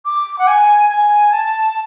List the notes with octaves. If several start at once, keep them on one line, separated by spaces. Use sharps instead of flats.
D6
F#5
G#5
G#5
A5